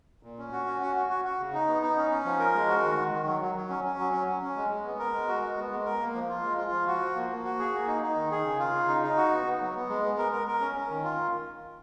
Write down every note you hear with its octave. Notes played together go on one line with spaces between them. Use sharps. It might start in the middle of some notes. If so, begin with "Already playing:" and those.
A#2
C#4
F#4
C#4
F#4
F#4
F#4
F#4
C#3
D#4
B3
D#4
C#4
C#4
F3
A#4
G#3
F#4
D#3
D#3
D#3
F#3
F#3
F#3
C#4
C#4
F#3
C#4
C#4
C#4
G#3
G#3
B3
A#4
G#3
F#4
G#3
B3
G#3
A#4
A#3
F3
F4
G#3
F4
F3
F#4
F3
A#3
A#3
F#4
G#4
A#3
D#4
D#4
D#3
G#4
C#3
F4
C#3
D#4
D#4
F#4
B3
B3
F#3
B3
G#3
B3
A#4
A#4
A#4
C#4
C#4
D#3
F4